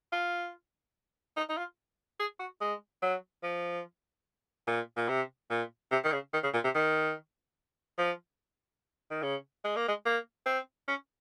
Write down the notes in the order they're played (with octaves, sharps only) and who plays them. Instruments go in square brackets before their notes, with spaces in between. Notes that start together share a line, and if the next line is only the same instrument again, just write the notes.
[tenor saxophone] F4
D#4
D#4
F4
G#4
F#4
G#3
F#3
F3
A#2
A#2
C3
A#2
C3
D#3
C#3
D#3
C#3
A#2
C3
D#3
F3
D#3
C#3
G#3
A#3
G#3
A#3
C4
C#4